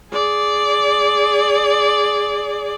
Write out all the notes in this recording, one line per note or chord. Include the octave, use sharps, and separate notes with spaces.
G#4 D5